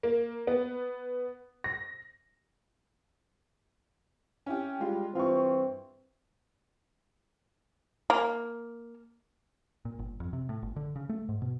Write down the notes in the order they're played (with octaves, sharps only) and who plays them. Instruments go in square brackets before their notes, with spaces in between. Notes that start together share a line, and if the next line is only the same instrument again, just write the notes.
[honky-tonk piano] A#3
B3
A#6
C#4 E4 G4
[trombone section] G3 [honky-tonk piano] G#3 F4
[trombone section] G2 E3 C4 [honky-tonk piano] F4 C#6
[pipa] A#3
[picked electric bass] A#2
G1
F2
C3
A2
G1
D3
C#3
A3
G#2
B2